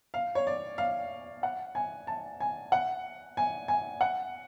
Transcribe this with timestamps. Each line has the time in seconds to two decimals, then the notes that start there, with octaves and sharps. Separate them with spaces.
0.14 F5
0.35 C#5
0.47 D5
0.78 F5
1.43 F#5
1.75 G#5
2.07 A5
2.40 G#5
2.72 F#5
3.37 G#5
3.68 G#5
4.01 F#5